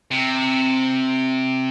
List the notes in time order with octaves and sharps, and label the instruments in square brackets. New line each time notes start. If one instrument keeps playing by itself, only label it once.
[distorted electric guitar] C3